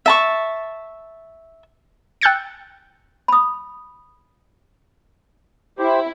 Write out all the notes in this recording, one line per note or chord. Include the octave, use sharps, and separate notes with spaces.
E5 A5 C#6
G5 E6 F#6 G6 A6 C#7
B5 D#6
E4 G4 C5